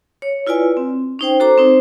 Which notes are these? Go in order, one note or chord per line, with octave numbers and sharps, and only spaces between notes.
C#5
E4 F4 B4 D5 G#5
C4
C#4 D#4 C5 G5
F#4 A4 C5 A#5 D6
C4 D#4 C5